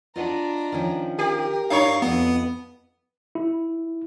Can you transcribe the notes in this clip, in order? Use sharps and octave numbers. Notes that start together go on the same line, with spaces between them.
D4 F4 D#5 F#5 A#5
D#3 F3 C#4
G4 A#4
G2 D4 E4 C#5 F5 C#6
F2 B3 B4 D#5
E4